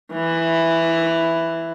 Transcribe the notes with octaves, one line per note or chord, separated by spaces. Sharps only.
E3 E4